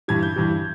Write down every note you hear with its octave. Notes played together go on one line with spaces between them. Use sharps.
G2 E3 G3 G#6
G6
G2 E3 G3